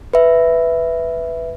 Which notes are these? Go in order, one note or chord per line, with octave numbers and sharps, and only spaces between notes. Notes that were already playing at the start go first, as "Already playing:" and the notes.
B4 E5